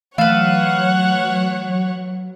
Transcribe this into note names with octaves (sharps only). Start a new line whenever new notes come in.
E3 F#3 A3 B4 C#5 F5 F#5 E7